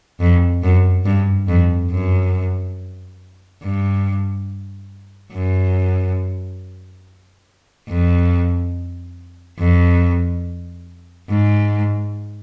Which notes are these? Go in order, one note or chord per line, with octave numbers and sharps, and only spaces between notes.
F2
F#2
G2
F2
F#2
G2
F#2
F2
F2
G#2